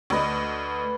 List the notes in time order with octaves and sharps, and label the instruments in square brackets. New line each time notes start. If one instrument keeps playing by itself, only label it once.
[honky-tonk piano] D2 D#5 [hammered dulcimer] B4 D5